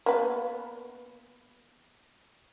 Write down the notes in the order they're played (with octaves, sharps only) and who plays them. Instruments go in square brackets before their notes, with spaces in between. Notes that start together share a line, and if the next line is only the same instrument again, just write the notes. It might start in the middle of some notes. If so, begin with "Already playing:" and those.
[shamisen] A#3 B3 B4